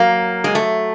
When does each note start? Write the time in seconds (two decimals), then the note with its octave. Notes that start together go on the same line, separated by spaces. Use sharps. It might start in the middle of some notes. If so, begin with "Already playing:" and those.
Already playing: F#3 A#3
0.44 G#3
0.55 A3